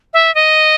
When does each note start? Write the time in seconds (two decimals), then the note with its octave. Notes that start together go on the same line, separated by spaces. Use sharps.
0.14 E5
0.35 D#5